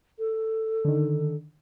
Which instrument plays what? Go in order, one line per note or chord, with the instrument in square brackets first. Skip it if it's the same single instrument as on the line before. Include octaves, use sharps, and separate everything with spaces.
[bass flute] A4
[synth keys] D3 D#3